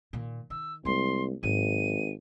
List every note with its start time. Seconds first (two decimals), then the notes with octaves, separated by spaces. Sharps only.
0.13 A#2 D#3
0.50 D#3 E6
0.85 C2 G#3 A#3 C6
1.43 G#1 G#2 F#3 D#7